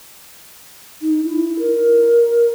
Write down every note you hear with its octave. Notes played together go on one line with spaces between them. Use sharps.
D#4
E4
A#4